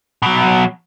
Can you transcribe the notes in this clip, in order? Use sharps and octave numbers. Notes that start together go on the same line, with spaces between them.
B2 F#3